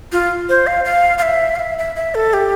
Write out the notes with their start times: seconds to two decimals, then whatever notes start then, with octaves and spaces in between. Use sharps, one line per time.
0.12 F4
0.49 C5
0.67 F5
0.85 F5
1.18 F5
1.22 E5
1.56 F5
1.59 E5
1.78 E5
1.96 E5
2.15 A4
2.33 G4